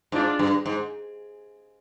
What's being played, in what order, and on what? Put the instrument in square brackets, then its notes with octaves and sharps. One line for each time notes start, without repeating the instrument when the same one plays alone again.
[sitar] G#2 [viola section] D4 F4
[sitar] G2
G#2